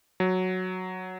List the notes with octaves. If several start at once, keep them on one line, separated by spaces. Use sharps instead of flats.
F#3